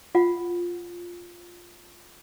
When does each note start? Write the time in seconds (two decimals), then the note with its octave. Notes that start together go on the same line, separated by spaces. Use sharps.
0.15 F4 F#5